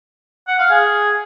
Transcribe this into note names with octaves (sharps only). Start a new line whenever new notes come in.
F#5
F5
G#4